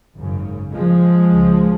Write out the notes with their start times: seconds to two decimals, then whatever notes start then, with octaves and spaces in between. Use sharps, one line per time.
0.16 G#1 F#2 C#3
0.73 F3 G#3
1.29 C#2 C#3